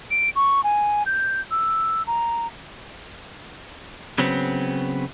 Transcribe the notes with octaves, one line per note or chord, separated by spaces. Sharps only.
D7
C#6
G#5
G6
E6
A#5
C#3 F#3 B3 C4